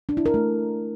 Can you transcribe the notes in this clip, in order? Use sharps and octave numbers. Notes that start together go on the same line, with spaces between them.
D4
E4
A#4
A3